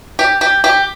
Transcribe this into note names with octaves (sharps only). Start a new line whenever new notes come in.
G4
G4
G4